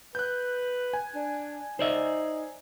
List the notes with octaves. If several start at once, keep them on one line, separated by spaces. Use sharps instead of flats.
B4 F#6 G6
G#5
D4
D#4 C5 D5 E5